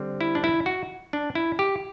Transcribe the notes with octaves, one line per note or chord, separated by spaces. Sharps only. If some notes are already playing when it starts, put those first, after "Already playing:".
Already playing: D3 G3 C4
E4
D4
E4
F#4
D4
E4
G4